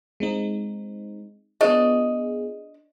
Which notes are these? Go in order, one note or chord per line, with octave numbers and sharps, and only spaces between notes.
G#3 C4 D#4
B3 D4 F4 G#4 C#5 D#5